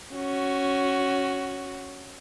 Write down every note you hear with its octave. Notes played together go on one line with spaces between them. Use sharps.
C#4 F#4